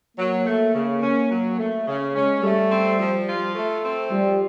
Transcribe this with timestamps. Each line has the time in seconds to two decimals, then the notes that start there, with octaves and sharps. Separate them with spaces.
0.17 F#3 A#3
0.45 A3
0.73 C#3
1.02 C#4
1.29 F#3
1.58 A3
1.86 C#3
2.14 G#3 C#4
2.42 G3 A3
2.70 C4
2.98 F3
3.27 F4
3.55 A3
3.83 C4
4.11 F3 G3